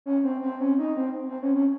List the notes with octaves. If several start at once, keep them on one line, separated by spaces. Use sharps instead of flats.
C#4
C4
C4
C#4
D#4
C4
C4
C#4
C#4